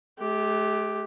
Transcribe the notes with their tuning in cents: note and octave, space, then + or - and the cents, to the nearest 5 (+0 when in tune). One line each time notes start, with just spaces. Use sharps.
A3 -45 G4 +0